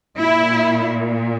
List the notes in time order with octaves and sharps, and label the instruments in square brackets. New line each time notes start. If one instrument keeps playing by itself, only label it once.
[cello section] A#2 E4